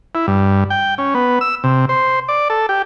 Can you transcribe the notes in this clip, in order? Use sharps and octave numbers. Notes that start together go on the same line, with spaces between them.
E4
G2
G5
C#4
B3
E6
C3
C5
D5
A4
G4